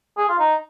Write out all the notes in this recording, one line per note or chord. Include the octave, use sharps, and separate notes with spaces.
G#4
F4
D#4